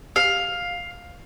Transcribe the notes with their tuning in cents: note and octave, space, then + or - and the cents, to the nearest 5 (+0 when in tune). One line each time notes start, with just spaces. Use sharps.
F5 +10